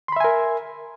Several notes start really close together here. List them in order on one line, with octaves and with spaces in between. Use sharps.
C6 B5 E5 G#5 A#4